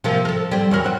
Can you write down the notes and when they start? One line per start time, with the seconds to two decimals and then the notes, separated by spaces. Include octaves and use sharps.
0.04 C3 F3 A#3
0.25 A4 A#4
0.51 G3 C4
0.71 E2 F#3 A#4
0.84 C4 F#4